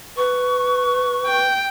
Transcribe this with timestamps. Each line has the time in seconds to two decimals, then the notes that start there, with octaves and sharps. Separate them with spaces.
0.17 B4 C#6
1.26 G5